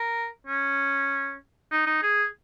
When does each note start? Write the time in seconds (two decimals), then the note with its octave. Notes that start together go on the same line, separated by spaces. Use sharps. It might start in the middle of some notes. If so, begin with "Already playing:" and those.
Already playing: A#4
0.47 C#4
1.72 D#4
1.87 D#4
2.02 G#4